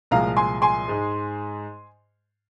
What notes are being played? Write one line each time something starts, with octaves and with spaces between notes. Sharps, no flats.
C2 A#2 F3 G#3 F5 A#5
G#5 C6
G#5 C6
G#2 G#3